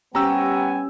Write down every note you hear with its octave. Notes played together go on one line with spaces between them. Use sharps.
G3 B3 C#4 G4 G5 G#5 A#5 E6